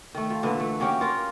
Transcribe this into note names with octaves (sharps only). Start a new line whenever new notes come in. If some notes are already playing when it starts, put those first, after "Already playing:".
D#3 A3
F3
A#2 D3 E3 B4
A3
A#3 C#4 F#4 G4
F4 A#4